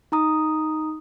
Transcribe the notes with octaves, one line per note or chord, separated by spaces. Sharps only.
D#4 A#5 D#6